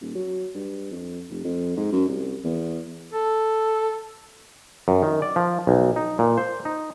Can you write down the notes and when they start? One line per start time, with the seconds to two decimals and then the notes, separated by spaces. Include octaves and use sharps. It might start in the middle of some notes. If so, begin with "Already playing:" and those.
0.01 D#1
0.15 F#3
0.55 G2
0.91 F2
1.30 F1
1.45 F2
1.77 G#2
1.92 F#2
2.09 C2
2.44 E2
3.13 A4
4.88 F#2
5.02 D#3
5.22 D5
5.36 F3
5.67 B1
5.96 D#4
6.19 A#2
6.38 C5
6.65 D#4